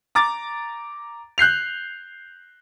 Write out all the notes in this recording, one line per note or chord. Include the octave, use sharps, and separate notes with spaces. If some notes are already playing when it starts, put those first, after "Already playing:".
A#5 D6 A6
F#6 G6 C7 F7